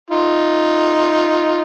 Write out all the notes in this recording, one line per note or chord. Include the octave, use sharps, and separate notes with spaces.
D#4 F4